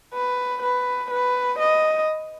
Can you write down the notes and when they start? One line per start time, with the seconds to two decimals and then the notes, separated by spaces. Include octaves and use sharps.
0.13 B4
0.62 B4
1.11 B4
1.59 D#5